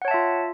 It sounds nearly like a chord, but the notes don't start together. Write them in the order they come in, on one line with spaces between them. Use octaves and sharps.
F#5 C#5 A5 E5 F4